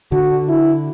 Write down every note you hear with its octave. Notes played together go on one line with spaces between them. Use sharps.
D3 F#4
E4